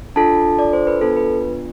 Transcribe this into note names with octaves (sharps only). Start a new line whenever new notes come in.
D4 F4 A4 A5
D5
C5
B4
B3 D4 F4 A4
B4